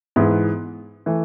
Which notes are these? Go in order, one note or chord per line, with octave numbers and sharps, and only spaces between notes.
G#2 E3 B3 E4
E3 A3